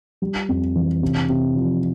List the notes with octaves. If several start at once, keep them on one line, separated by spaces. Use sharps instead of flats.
G3
F2
E3
C3
C3
F3